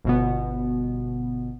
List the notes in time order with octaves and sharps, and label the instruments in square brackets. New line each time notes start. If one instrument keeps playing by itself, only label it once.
[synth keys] G1 B2 B3